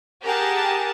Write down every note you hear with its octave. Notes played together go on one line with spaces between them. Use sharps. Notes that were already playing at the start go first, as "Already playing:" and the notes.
G4 G#4 A#4 F#5 A5